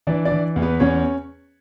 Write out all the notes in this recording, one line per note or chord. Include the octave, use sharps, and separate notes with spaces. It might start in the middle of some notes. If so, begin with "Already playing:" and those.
E3 D4 D5
D4 D5
E3
E2
B3 B4
E2 C#4 C#5